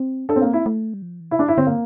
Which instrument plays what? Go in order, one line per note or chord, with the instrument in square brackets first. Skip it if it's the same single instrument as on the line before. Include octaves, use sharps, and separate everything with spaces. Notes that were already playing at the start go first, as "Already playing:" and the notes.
Already playing: [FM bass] C4
[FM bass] D4 [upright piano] A4
[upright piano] C4
A#3
[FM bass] C4
[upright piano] E4
[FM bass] A3
G3
F3
E3
[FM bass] C3 [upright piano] E4
[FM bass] D3 [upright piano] D4
[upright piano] E4
[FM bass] D3 [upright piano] C4
[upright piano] A#3